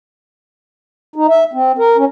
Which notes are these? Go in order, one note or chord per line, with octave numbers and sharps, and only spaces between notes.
D#4
E5
C4
A#4
C#4